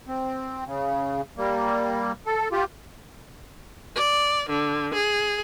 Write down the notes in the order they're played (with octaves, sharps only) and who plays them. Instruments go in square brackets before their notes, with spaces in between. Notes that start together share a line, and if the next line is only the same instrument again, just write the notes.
[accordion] C4
C#3
G3 A#3
A4
F4 G4
[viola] D5
D3
G#4